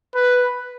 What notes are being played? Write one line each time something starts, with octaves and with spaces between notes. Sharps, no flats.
B4